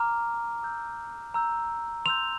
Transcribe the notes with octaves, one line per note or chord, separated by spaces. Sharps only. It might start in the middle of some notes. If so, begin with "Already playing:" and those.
Already playing: A#5 D6 F6
A#5 E6 G6
A#5 E6 G6
C6 E6 G6 F7